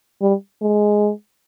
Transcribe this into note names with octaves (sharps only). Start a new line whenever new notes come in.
G3
G#3